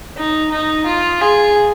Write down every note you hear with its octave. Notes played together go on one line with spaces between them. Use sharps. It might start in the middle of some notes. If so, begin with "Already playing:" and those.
D#4
D#4
F4
G#4